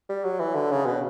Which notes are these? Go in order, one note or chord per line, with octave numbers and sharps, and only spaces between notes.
G3
F#3
E3
D3
C#3
B2